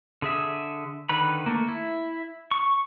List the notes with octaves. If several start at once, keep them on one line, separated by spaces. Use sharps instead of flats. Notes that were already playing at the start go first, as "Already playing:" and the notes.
D3 G#4 E5
D3 D#3 B4 B5
A3 A#3
E4
C#6